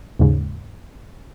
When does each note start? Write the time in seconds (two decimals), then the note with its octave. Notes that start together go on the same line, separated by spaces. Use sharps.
0.19 D#2 G#2 C#3